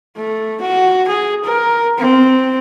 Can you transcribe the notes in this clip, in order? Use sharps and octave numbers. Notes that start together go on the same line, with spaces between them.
A3
F#4
G#4
A#4
C4